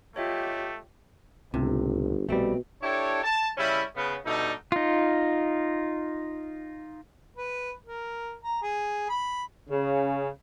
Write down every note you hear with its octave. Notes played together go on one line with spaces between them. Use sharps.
A3 F4 G4 C#5 D#5 E5
G1 C#2 A2 C3
A#1 B2 G3 A3 C4
D4 E4 G4 A4 C#5
A5
C#3 G3 C#4 E4
C#3 B3
B2 G3 A3 D4 D#4
D#4 F4
B4
A#4
A#5
G#4
B5
C#3